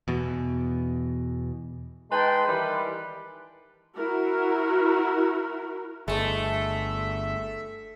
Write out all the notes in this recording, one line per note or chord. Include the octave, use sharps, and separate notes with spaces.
E2 B2
G#3 D#4 B4 G5 A5 C6
D#3 E3 G3 B4
E4 F#4 A#4
G1 G#3 A3 E5 A5